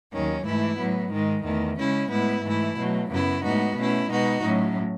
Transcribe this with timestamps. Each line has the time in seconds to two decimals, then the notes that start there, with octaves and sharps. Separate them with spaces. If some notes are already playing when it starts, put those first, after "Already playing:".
0.12 D#2 D#3 F#3 C#4
0.45 G#2 E3 A3 E4
0.78 A2 F#3 B3
1.12 G#2 D#3 G#3
1.44 E2 D#3 A3
1.78 C#3 G#3 C#4 E4
2.11 A2 G#3 B3 E4
2.44 G#2 E3 A3 E4
2.77 B2 F#3 A3
3.10 F#2 C#3 F#3 B3 E4
3.43 A2 G#3 B3 D#4 F#4
3.77 B2 A3 C#4 E4
4.10 B2 G#3 B3 D#4 F#4
4.43 A2 F#3 C#4